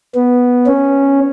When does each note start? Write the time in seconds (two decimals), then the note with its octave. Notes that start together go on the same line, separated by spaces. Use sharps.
0.15 B3
0.66 C#4